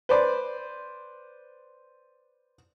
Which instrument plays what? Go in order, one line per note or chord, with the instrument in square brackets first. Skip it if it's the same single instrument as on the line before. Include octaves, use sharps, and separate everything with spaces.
[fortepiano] B4 C5 D5